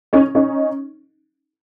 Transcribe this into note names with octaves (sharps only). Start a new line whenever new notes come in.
C#4 D#4
C#4 D#4